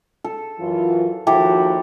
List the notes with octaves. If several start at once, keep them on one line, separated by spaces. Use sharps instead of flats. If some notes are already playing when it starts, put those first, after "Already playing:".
A4
F#2 E3 F4
D#2 F3 E4 F#4 G4 A4